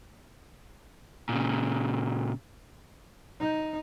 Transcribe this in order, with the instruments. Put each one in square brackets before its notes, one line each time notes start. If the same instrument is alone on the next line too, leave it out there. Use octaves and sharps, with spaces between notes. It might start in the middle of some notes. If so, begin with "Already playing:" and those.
[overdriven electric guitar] A#2 C#3
[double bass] D#4